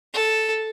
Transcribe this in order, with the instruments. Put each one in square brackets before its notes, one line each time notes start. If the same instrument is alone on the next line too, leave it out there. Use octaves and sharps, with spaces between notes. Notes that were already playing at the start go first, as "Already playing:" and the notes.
[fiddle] A4